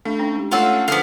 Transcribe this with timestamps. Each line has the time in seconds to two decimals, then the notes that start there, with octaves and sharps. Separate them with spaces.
0.05 A3 D4 F5
0.19 C#4 D#4 G5
0.36 G#3 G4
0.52 A3 C#4 F4 F5 F#5 E6
0.88 D3 F3 B3 G#4 F5